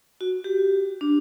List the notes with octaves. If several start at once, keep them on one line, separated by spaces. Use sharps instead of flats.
F#4
G4
D4